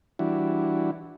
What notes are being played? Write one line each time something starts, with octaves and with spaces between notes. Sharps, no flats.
E3 G3 D4 E4 F#4